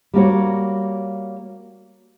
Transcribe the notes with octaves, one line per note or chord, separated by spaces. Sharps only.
G3 A#3 F#4 C#5